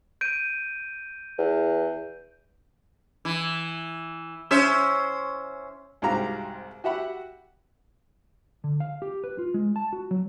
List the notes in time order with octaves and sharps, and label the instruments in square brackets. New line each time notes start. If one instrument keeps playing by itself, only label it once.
[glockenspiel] G6 D7 D#7
[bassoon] E2
[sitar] E3
C#4 C5 E5
[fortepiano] C2 G#2 F#4 G4 F5 A#5
F#4 G4 E5 F#5 B5
[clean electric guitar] D3
F5
G4
B4
F4
G#3
A5
F#4
F#3